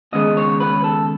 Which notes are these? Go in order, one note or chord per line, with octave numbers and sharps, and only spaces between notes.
D#2 C#3 G#3 B3 D#5
C#5
B4
A4